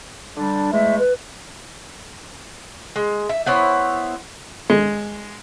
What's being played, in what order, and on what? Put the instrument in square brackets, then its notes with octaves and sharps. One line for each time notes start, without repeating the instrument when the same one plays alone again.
[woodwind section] D3 G3 D4
[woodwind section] E2 G#3 A3 [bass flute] E5
[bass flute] B4
[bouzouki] G#3
E5
B3 E4 C5 C#5
[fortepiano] G#3